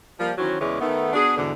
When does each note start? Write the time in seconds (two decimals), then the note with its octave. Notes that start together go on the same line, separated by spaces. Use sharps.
0.18 F3 G3 A#3
0.38 D#3 E3 F#3 C#4 F#4 C5
0.60 E2 C#3 E3 G#3 C#4 D5
0.80 D#3 A3 B3
1.13 B3 D4 F#4 G#4
1.36 E2 G#2 B2 D3